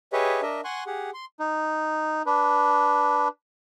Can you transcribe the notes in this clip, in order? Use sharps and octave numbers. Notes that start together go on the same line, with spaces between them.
G4 G#4 B4 C#5 D#5 E5
D4 A#4 D#5 E5
F#5 G#5 C6 C#6 F#6
G4 G#4 F#5
C6
D#4
D4 B4